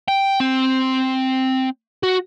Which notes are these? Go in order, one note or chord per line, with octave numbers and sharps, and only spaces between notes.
G5
C4
F#4